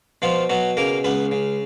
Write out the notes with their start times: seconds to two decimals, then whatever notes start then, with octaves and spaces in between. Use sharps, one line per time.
0.22 B2 F3 F4
0.49 B2 F#3 F#4
0.77 C#3 A#3 A#4
1.04 C#2 B3 B4
1.31 C#3